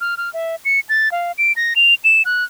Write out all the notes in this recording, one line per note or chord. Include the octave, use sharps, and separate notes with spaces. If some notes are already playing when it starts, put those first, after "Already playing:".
F6
F6
E5
C#7
A6
F5
D7
A#6
F7
E7
F#6